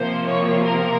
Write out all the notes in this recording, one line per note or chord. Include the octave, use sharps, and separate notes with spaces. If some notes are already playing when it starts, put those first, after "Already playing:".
Already playing: C3 F3 A#3 C5
C#5
A#4